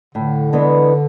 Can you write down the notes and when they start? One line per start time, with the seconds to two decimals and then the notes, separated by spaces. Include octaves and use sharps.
0.15 A2 D3
0.53 E3 G#3 B3 D4